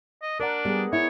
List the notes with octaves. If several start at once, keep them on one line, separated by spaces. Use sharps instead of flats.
D#5
D4 A#4 D5 F#5
G3 B3 G#4
E4 C#5